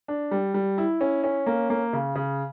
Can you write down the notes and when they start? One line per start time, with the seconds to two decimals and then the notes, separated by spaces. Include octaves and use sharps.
0.08 D4
0.31 G3
0.54 G3
0.78 E4
1.01 C#4
1.24 C#4
1.47 A#3
1.70 A#3
1.93 C#3
2.15 C#3